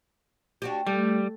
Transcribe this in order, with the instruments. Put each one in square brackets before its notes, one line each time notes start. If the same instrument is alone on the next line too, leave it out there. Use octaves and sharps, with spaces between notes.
[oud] D4 F#4 G4
[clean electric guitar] G3 [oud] A3